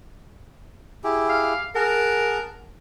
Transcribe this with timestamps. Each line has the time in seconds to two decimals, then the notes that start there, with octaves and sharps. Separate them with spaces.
1.04 E4 G4 G#4
1.29 F5
1.75 G#4 A#4 F#5 A5